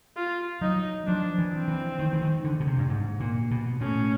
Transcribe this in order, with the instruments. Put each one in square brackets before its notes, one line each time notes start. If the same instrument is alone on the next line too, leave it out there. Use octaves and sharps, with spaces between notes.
[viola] F4
[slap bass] F#3 [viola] D#4
[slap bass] F3 [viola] D4
[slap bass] E3
[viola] C4
[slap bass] E3
D#3
E3
D#3
D3
B2
C3
G2
G#2
A#2
B2
[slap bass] A2 [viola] C#4